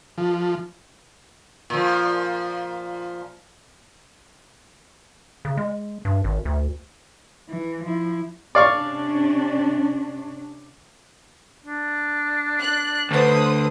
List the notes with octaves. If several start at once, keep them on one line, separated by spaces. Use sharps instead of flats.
F3
A#2 F3
C#3
G#3
G2
G#1
D2
E3
F3 E4
C3 C#4 D4 D5 F5 C#6
D4
F#6
D2 B4 C5 D#6